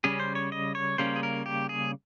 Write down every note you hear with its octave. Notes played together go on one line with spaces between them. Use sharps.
C#3 G3 C#4 G#4
C5
C#5
D#5
C#5
C#3 G3 A#3 C#4 C5
G#4
A#4
G4
G#4